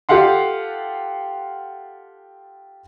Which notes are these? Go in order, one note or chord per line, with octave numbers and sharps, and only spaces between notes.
F4 G4 A4 F5 F#5 C6